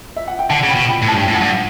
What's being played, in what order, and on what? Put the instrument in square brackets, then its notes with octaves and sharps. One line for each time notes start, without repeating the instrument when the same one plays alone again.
[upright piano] E5
F#5
G5
[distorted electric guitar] D3 [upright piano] F#5 A5
[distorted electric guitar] C#3
[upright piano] G5 B5
[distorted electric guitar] B2
[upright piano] G5 B5
[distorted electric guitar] A2
[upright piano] A5
[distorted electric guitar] G2
[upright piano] G5
[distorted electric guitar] A2
[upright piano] F#5 A5
[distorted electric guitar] G2